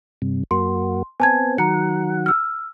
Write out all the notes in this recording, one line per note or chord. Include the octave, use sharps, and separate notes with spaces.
G2 C3
F#2 A#3 F#4 C6
B3 C4 G#5 A5 G#6
D#3 F#3 F#5 A#5 C#7
E6 F6